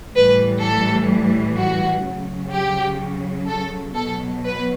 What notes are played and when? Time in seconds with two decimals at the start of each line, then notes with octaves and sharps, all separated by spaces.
0.15 A2 E3 G3 B4
0.63 A4
1.58 F#4
2.06 C#3 F#3
2.53 G4
3.49 A4
3.96 B2 F#3 A4
4.44 B4